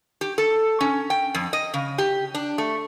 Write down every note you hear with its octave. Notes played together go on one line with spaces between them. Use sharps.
G4
A4
C#4
G5
F2
D#5
C#3
G4
D4
A3